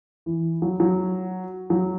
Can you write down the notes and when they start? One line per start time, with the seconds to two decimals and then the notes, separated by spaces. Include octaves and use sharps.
0.26 E3
0.62 F#3
0.80 F#3
1.70 F#3